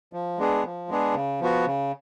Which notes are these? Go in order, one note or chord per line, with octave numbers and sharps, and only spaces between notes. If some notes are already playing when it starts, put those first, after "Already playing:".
F3
G#3 B3 D4 G#4
F3
G#3 B3 D4 G#4
C#3
F3 B3 F#4
C#3